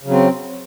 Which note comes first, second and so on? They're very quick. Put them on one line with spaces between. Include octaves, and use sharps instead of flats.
C#3 F#3 C4